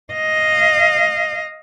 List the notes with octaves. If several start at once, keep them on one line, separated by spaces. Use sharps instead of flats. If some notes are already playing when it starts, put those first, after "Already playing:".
D#5 F5